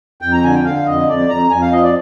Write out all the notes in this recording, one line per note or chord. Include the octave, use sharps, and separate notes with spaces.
F2 G5
A#5
D3 G#5
G5
D3 F5
F2 D#5
F2 D5
F2 A#5
F2 G#5
F5
F3 D#5
D5